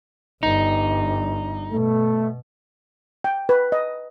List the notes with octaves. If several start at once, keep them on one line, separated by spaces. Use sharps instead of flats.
G1 G2 D#4
B2 A3
G5
B4
D#5